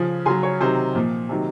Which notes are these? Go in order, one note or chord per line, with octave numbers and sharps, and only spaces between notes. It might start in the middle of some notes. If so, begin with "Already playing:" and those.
Already playing: C#3 F3
C#3 F#3 G#5 C6
C#5
C3 D#3 F#3 C5
A#2 F3
C3 D#3 F#3